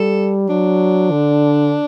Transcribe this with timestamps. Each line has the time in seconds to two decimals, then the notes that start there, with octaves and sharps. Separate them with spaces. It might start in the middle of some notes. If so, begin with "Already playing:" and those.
Already playing: G3 A4
0.49 F#3 D4
1.11 D3